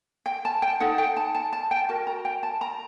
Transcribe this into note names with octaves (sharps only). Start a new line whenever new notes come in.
G5
A5
G5
D#4 A4 F#5
G5
A5
A5
A5
G5
F#4 A#4 A5
A#5
G5
A5
A#5